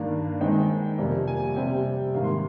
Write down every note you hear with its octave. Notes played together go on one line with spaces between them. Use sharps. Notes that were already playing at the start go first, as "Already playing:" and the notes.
Already playing: G2 D#3 A#3 D4 F5
D#3 G#3 C4 D#4 G5
F2 C3 G3 A#3
G#5
C3 G3 C4 G5
G#2 D#3 A#3 F5
C6